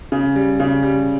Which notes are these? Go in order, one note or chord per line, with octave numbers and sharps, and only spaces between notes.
C#3
G3
C#3
G3